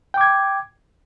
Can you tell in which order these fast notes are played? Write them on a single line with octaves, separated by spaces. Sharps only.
G5 D6 G#6